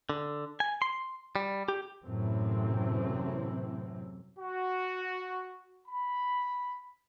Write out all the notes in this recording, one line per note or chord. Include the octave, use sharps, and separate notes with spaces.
D3
G#5
C6
G3
G4
F#2 A2 C3 E3 C4
F#4
B5